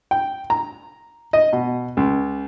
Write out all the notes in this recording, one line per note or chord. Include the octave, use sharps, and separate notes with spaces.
G5
A#5
D#5
B2
C#2